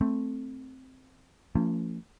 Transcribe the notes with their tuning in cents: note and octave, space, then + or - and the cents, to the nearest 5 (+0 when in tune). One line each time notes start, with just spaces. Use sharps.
A3 +0 C4 +0
F3 -15 A3 +45 C#4 +30